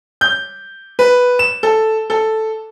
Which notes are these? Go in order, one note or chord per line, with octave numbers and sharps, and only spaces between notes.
G6
B4
E7
A4
A4